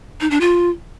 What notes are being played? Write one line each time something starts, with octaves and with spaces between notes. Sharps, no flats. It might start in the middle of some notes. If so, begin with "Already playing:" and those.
D#4
D4
F4